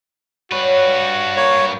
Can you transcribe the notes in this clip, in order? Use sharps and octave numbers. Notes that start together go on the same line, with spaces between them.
G2 F#4 B4 C#5
A#3 C#5